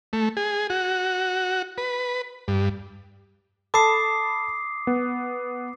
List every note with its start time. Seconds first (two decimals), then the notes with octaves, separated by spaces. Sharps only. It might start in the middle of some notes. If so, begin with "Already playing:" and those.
0.13 A3
0.37 G#4
0.70 F#4
1.78 B4
2.48 G2
3.74 A4 A5 B5 D6 D#6 C7
4.87 B3